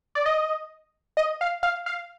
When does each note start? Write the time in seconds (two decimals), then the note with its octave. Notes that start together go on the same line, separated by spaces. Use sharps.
0.15 D5
0.26 D#5
1.17 D#5
1.41 F5
1.63 F5
1.86 F5